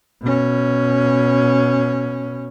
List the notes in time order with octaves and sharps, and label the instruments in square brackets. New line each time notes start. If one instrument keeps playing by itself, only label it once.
[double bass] B2 C#4